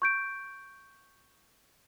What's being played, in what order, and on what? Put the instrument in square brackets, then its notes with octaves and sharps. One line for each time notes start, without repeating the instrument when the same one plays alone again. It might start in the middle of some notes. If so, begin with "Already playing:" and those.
[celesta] C#6 G6 D7